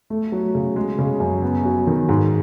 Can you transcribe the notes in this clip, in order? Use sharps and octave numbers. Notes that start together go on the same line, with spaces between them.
A3
F#3
C#3
G#3
C#3
F#2
B3
F#3
D#3
G#2